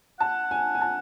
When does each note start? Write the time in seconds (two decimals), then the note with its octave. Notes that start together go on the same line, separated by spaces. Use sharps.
0.19 F#5 A5
0.51 G#5
0.75 G#5
0.81 A5